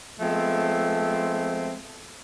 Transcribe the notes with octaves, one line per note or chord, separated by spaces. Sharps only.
F3 G#3 A3 B3 C4